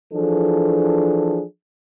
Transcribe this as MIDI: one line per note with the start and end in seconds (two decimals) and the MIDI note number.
0.13 1.43 52
0.13 1.43 53
0.13 1.43 62
0.13 1.43 68
0.13 1.43 69